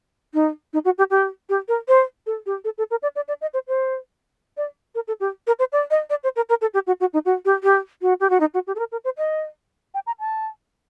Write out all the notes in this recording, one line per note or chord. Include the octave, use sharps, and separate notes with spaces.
D#4
D#4
F#4
G4
G4
G4
A#4
C5
A4
G4
A4
A4
A#4
D5
D5
D5
D#5
C5
C5
D5
A#4
A4
G4
A#4
C5
D5
D#5
D5
C5
A#4
A#4
A4
G4
F#4
F#4
D#4
F#4
G4
G4
F#4
G4
F#4
D#4
F#4
G4
A4
A#4
A#4
C5
D#5
G5
A#5
A5